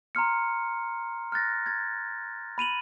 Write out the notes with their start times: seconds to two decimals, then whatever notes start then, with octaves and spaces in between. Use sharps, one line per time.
0.15 A#5 C6 F6 C#7
1.32 F6 F#6 A6 A#6
1.66 G#6 A6
2.58 B5 D#7 F7 F#7